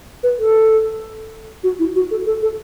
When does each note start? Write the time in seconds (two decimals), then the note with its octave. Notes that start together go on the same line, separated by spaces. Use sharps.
0.23 B4
0.39 A4
1.64 F#4
1.79 E4
1.96 F#4
2.11 A4
2.26 A4
2.42 A4